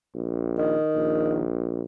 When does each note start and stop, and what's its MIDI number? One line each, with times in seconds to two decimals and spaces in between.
0.15 0.75 34
0.58 1.44 51
0.96 1.82 34